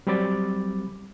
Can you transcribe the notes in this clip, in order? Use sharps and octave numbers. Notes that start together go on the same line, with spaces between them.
F#3 G3 C4 B5 D6 A6